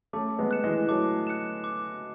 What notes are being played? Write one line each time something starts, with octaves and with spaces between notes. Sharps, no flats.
A3 C#4 D6
G#3 B3
F#6 C#7 E7
E3 G#3
F#3 A3 D6
F#6 C#7 E7
D6